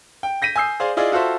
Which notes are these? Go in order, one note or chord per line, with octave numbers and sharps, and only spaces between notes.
G5
G6 A#6 B6 D#7
G#5 D#6 E6 G6 C7
G#4 C5 D5 F5 G#5
E4 F4 G#4 D5 D#5
F4 F#4 A4 C5 E5